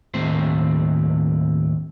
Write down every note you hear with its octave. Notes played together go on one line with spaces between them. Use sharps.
D#2 A2 C4 C5